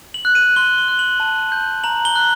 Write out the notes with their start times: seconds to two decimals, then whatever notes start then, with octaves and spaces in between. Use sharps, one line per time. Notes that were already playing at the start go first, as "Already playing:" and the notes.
0.14 F#7
0.25 F#6
0.35 D#7
0.56 C6 G7
0.78 G7
0.88 F#6
0.99 F#7
1.20 A5
1.52 G6
1.84 A#5 F#7
2.05 G7
2.16 F#6